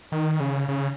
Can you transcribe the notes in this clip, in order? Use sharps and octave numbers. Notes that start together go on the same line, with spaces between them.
D#3
C#3
C#3